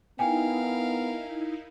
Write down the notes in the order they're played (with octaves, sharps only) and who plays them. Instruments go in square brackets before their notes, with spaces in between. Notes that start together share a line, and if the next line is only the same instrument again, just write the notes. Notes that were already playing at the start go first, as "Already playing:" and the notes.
[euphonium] B3 [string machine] D#4 E4 [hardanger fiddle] A#4 F5 [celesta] G5 G#5